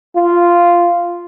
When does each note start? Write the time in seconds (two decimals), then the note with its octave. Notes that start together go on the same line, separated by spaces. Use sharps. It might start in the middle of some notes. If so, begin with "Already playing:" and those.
0.16 F4